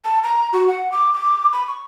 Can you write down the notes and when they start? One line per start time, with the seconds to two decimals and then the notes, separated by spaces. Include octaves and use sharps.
0.05 A5
0.23 A#5
0.53 F#4
0.67 F#5
0.92 D6
1.14 D6
1.53 B5
1.67 C#6